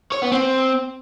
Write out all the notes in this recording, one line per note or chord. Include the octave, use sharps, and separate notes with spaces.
C#5
B3
C4